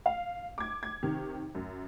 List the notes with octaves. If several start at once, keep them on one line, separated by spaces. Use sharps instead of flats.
F5
D6 G#6
G#6
C3 D#3
F#2